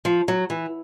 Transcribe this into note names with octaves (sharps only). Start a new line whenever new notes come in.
F3
F#3
E3